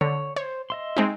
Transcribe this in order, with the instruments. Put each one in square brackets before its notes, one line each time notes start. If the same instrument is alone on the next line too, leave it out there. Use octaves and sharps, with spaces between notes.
[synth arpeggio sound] D3 [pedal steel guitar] C#5
[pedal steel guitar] C5 [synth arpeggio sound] C#5
[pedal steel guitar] D#5 E5 C6
[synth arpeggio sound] G#3 C4 D#4